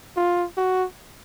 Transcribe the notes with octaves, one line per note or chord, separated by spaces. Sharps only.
F4
F#4